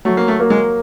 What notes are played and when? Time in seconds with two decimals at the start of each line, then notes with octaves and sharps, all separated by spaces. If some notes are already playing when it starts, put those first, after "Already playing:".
0.05 F#3 A3
0.17 A#3
0.28 A3
0.40 A#3
0.50 G#3